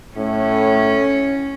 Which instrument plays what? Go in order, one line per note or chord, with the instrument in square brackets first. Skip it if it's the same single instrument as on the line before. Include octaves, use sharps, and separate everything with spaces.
[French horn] A2 [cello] C#4